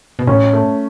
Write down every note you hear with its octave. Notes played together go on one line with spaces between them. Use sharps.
B2
A2 C#4
A3